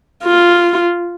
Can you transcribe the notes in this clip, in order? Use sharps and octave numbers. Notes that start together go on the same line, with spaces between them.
F4